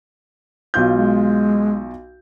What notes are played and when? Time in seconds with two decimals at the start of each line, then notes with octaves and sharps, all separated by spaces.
0.74 B1 F4 G6
0.92 G#3